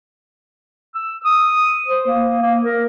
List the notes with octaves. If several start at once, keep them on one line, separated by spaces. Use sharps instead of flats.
E6
D#6
C5
A#3
A#3
A#4